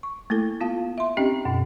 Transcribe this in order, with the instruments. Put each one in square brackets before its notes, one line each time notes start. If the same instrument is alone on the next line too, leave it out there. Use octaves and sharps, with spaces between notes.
[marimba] C#6
A3 A#3 E4 A4
B3 F4 F5 A5
E5 C6
C4 C#4 D#4 G4 D#5 G5
F#2 B2